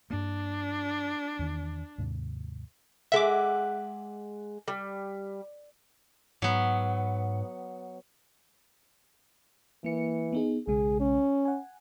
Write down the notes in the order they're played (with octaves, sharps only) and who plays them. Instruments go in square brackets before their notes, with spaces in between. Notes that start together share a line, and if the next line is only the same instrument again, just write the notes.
[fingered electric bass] G2 A#3 [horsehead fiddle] D4
[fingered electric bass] E2 D#3
D#2 G#2 C3
[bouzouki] G#3 F#5 [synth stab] E5 D6
[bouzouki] G3
[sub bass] G#2 [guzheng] F#3 B3
[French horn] E3 [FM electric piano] A#3 C#7
[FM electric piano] B3 D#4 G#4
[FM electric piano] B1 C#3 G#3 [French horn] G#4
[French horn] C#4
[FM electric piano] F#5 G#5